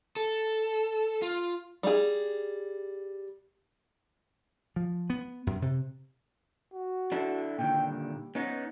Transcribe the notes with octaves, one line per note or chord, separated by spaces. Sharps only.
A4
F4
G3 G#4
F3
B3
F#2
C3
F#4
D4 E4 A4
A#2 D3 D#3 G5
G3
B3 C#4 D#4